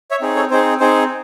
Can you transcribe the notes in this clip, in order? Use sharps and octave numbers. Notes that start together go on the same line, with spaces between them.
C#5 E5
C4 D#4 G#4
A4 C#5
C4 D#4 G#4 C5
C4 D#4 G#4 C5